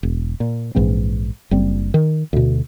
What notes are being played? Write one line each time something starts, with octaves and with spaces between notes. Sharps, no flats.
E1
A#2
A#1 G#2 E3 C4
F#1 G3 C4
D#3
D2 B2